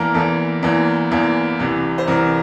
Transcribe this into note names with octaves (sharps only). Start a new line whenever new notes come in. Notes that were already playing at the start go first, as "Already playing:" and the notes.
Already playing: E2 E3 A#3 A4 A#4
E2 E3 A#3 A4
E2 E3 A#3
E2 E3 A#3
C2 C3 E3
C5
C2 C3 E3 A#4